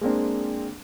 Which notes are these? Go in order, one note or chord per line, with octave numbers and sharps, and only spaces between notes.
G#3 A#3 C4 D4